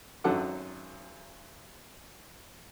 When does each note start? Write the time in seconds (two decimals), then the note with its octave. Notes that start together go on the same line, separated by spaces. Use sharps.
0.24 G#1 F#2 F#3 A4 F#5 D6